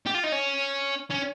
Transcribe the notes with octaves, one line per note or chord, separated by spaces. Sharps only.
G4
F4
D#4
C#4
C#4